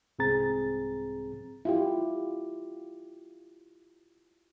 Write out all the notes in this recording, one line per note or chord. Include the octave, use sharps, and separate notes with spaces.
C2 G#2 C4 G#4 A#5 A6
E4 F4 G4